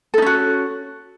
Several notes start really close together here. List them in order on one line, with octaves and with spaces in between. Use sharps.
A4 D#4 C#4 F#4